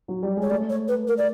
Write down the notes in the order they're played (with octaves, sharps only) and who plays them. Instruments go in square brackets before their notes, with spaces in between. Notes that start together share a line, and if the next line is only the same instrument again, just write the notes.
[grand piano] F#3
G3
G#3
[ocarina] C#5
[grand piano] A3 [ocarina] D5
[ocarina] C#5
B4
A#4
D5